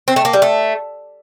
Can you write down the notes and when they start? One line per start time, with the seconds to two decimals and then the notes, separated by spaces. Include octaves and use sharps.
0.08 C4
0.16 A3
0.25 A#3
0.33 G3
0.42 A3